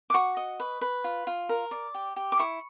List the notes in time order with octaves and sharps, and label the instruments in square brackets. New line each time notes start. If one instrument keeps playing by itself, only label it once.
[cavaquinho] D6
F#4 C#6
D#5
B4
B4
F4
F4
A#4
D5
G4
G4
D6
E4 C#6